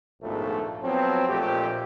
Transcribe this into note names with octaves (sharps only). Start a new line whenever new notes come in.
A#1 D#2 G#2 B2 F3 A3
F3 F#3 B3 C4
A#1 F2 A#2 A3 G4